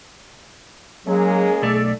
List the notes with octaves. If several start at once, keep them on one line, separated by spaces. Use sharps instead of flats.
F#3 G#3 A#3 C#4 G#4
B1 A3 A4 D5